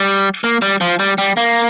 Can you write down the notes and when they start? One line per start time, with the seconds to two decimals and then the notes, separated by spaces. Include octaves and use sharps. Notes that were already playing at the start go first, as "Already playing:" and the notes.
Already playing: G3
0.44 A#3
0.62 G3
0.81 F3
1.00 G3
1.18 G3
1.37 A#3